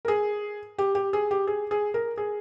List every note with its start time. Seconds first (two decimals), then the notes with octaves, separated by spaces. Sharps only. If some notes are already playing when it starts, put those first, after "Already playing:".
0.05 A#4
0.08 G#4
0.78 G4
0.95 G4
1.13 G#4
1.31 G4
1.47 G#4
1.71 G#4
1.94 A#4
2.17 G#4